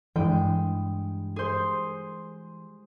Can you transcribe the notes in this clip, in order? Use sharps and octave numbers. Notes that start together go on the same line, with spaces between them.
G2 E3 G#3 G5
G#4 C5